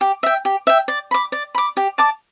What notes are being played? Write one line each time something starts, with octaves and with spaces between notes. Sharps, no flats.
G4
E5 G5
G4
E5 G5
D5
B5 D6
D5
B5 D6
G4
D5 A5 D6